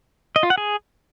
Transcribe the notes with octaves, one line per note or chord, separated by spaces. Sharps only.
D#5
F4
F#5
G#4